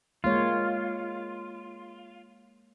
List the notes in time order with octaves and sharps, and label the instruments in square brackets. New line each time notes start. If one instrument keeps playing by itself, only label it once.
[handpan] G#3 A#3 C#5 [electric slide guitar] F4